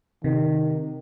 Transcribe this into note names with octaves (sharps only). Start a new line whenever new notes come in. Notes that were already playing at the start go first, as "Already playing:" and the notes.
C3 D#3